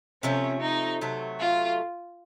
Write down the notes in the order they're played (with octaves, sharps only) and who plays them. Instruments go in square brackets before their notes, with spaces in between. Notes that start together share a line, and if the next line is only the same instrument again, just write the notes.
[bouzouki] C3 F3 A3 [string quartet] C#4
[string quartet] D#4
[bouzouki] C3 F#3 A3
[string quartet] F4